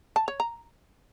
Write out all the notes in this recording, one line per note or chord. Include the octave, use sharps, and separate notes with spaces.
A5
C#5
A#5